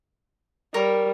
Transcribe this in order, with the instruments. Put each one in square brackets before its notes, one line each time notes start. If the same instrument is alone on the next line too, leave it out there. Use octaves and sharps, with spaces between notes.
[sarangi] G3 [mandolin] A#4 C#5